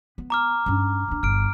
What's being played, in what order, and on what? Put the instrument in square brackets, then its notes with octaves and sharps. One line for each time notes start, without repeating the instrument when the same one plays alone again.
[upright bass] B3
[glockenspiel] A#5 D6 F6
[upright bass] G2 C#4
D#2 D4
[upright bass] G1 [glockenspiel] F6 D7